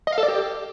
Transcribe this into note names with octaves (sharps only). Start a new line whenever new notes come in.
D#5
F5
A4
D5
G4